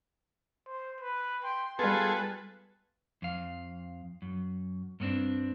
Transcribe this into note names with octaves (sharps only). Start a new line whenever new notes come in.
C5
B4
G5 C6
G3 B3 F4 G#4 A4 B4
F2 F5
F#2
G2 B3 C4 D4